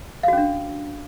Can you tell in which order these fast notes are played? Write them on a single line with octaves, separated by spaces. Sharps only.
F5 F#4 C#4 D4